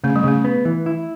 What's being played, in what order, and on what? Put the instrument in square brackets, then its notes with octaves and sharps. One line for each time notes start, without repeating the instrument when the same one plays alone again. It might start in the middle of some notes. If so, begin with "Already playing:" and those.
[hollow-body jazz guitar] C#3 [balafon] A3
[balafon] G3
[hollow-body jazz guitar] C#3 [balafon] A3
[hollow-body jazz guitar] B3
E3
E4